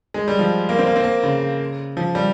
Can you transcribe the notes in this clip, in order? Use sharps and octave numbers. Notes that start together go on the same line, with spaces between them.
G#3
G3
F3
A#3
C4
A#3
C4
A#3
C#3
F3
G3